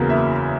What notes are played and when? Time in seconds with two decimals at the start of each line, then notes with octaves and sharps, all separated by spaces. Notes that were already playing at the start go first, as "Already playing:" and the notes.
Already playing: F#1 E2 C#3 F#3 A#3
0.10 E5